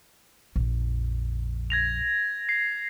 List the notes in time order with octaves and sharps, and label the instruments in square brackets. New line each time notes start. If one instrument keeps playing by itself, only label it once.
[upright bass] A#1 F2
[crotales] G#6 A#6 F7
C7